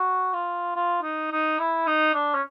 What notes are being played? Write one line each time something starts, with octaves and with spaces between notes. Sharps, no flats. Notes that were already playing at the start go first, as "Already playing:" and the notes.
Already playing: F#4
F4
F4
D#4
D#4
E4
D#4
D4
C#4